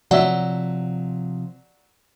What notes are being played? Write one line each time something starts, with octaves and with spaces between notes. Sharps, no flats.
C3 F3 F#3 D5 E5 F#5